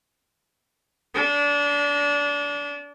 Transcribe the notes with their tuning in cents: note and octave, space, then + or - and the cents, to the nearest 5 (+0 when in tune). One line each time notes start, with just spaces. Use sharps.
D4 -25